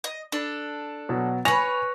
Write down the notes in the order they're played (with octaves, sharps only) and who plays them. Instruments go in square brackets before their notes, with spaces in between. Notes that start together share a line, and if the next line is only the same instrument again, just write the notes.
[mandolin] D#5
D4 A4
[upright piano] B2 F#3
[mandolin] B4 C#5 [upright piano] G#5 A#6 F7